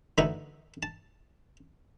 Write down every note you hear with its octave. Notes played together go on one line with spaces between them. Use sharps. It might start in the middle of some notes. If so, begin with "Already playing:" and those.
D3 E3 A3 D#4 E4 F#4
A5